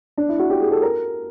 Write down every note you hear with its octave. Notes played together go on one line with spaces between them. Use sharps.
D4
E4
F#4
G4
G#4
A4
A#4